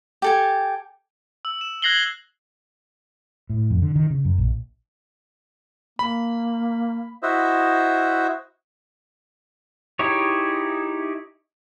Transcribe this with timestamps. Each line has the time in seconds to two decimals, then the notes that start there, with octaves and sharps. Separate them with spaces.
0.22 G4 A4 G#5
1.45 E6
1.61 E7
1.82 F#6 G#6 A#6 C7 F#7 G7
3.50 A2
3.70 F2
3.82 D3
3.96 D#3
4.10 C#3
4.25 F#2
4.38 A#1
5.99 A#3 B5
7.22 E4 F#4 C5 D#5 E5
9.99 D#4 E4 G4 G#4 C#5